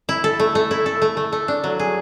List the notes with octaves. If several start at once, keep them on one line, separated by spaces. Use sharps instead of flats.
E4
A4
A3
A3
E4
A4
A3
A3
A3
D4
F#3
G#4